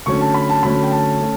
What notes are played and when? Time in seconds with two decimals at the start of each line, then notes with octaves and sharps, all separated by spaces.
0.06 D3 F#3 A3 C#4 C#6
0.21 A5
0.34 B5
0.50 A5
0.63 D3 F#3 A3 C#4 B5
0.83 G5
0.92 A5
1.21 A3 C#4